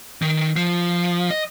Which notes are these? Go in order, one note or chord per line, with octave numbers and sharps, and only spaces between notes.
D#3
F3
D#5